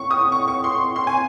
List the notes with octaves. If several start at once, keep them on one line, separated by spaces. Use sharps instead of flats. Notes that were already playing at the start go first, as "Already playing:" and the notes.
Already playing: C#6
D#6
C#6
C#6
C6
C6
G#5